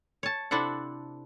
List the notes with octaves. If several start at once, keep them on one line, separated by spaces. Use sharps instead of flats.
C#5 A5
C3 D4 E4 A4 C5 F#5